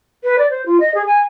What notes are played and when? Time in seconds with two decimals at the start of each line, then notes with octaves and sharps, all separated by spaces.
0.23 B4
0.38 D5
0.50 C5
0.65 F4
0.80 D#5
0.94 G#4
1.06 G#5